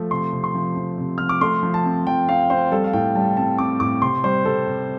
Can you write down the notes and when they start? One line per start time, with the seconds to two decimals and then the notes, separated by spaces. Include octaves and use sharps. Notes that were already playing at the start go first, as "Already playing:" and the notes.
Already playing: F3 A3
0.11 C3 C6
0.33 C3
0.44 C6
0.54 F3
0.76 F3
0.98 C3
1.18 F3 F6
1.29 D6
1.41 A3 C6
1.63 F3
1.74 A5
1.85 C4
2.07 F3 G5
2.28 C4 F5
2.50 C4 C5
2.71 G3 A4
2.84 F5
2.93 A2 G5
3.15 G3 A5
3.37 C4 A5
3.58 C4 D6
3.80 A2 D6
4.02 C3 C6
4.24 G3 C5
4.45 C3 A4
4.67 C3